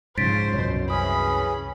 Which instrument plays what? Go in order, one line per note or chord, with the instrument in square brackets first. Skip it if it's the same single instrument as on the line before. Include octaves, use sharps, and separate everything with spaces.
[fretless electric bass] G#2 C#3 F3 [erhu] C5 [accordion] C#5 [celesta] A6 B6 D7
[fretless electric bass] C2 F#2 [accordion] B2 [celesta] C#5
[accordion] E3 C#4 G#4 [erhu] B5 [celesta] D#6